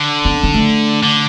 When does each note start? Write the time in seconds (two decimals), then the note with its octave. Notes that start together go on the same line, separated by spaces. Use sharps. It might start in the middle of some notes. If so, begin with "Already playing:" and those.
Already playing: D3
0.25 B3
0.43 B3
0.54 A3
1.03 D3